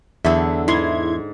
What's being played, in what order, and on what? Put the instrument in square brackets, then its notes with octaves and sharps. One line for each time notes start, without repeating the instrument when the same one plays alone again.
[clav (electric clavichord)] E2 [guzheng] D3 F#3 [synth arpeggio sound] E5
[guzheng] G#2 [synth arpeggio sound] E4 C6 G#6